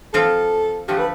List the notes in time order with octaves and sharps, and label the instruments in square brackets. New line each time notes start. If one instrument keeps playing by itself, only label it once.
[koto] F3 C4 F4 [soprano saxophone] A4
[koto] D3 F3 A3 [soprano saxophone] G4
[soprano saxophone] B4